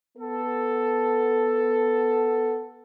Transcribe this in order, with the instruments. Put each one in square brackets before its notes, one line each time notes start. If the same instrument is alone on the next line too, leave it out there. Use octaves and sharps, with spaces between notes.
[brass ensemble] B3 A4